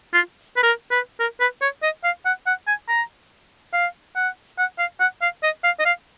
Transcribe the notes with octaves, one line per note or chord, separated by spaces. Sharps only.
F4
B4
A#4
B4
A#4
B4
C#5
D#5
F5
F#5
F#5
G#5
A#5
F5
F#5
F#5
F5
F#5
F5
D#5
F5
D#5
F5